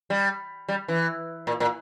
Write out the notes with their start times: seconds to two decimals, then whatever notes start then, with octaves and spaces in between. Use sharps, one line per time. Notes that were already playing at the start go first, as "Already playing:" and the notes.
0.10 G3
0.69 G3
0.88 E3
1.47 A#2
1.60 A#2